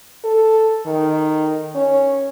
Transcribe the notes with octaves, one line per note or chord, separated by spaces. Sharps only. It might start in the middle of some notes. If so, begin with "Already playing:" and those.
A4
D#3
C#4